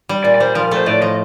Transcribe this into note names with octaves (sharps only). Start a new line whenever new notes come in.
G3
A#2 D5
D5
G3 C5
F3 A#4
A3
C5
A2 D5
F3 D#5